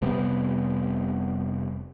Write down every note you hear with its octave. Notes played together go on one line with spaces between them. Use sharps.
F1 C3 G3 B3